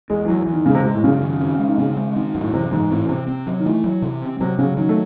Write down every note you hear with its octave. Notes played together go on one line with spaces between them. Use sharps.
E2 G#3
E3
E2 F#3
E3
E2
D#3
C#3 G#3
C3
C3 G#3
A2
F#2 C#3
D#3
C4
G#3
D#3
C#3 C4
G#3
D#3 C4
F#2
A2
C3 E3
G#2 E3
A2 C4
C3 C4
C4
F#3
D#3
E3 A3
F#3
C3
C4
C3 F#3
C#3 F#3
D#3 F#3
A3